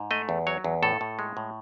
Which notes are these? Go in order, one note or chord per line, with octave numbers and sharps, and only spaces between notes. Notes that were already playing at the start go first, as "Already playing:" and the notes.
Already playing: G#2
A3 D#5
E2
F#3 C#5
E2
A2 A4
A2
G#3
A2